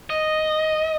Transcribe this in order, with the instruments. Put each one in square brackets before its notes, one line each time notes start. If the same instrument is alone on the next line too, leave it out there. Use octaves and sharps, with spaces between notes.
[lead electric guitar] D#5